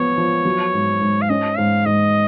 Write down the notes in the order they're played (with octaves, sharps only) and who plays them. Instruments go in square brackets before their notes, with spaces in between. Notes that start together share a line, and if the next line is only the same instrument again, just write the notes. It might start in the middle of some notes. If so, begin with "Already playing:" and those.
Already playing: [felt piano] F3 B3 [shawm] C#5
[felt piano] F3
F#3
G#2
G#2
[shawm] F5
[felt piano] C#4 [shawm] D#5
[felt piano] G#2 [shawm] F5
[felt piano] G#2 [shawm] D#5